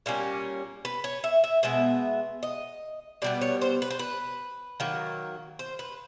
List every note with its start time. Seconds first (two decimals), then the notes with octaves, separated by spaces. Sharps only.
0.06 A#2 G3 A#3 C#4
0.85 B4
1.04 C#5
1.24 E5
1.44 E5
1.63 B2 G#3 B3 E5
2.43 D#5
3.22 B2 G3 B3 D5
3.41 C#5
3.62 C5
3.82 B4
3.91 C5
3.99 B4
4.80 D#3 F#3 A#3
5.59 C5
5.79 B4